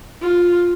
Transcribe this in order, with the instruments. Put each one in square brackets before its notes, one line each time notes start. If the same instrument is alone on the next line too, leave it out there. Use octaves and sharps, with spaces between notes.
[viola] F4